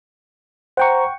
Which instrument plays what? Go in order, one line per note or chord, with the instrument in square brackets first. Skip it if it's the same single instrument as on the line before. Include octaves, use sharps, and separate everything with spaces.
[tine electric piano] C5 A#5 [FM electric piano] F#5 G5 C#6